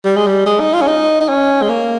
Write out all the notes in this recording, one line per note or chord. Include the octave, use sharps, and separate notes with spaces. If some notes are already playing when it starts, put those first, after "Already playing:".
G3
G#3
G3
G#3
D#4
F4
C#4
D#4
D#4
C#4
G#3
A#3